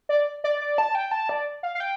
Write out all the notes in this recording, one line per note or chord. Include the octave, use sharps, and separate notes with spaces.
D5
D5
D5
A5
G5
A5
D5
F5
F5
G5